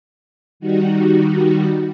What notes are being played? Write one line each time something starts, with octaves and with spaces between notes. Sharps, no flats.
D#3 G3 D#4 F#4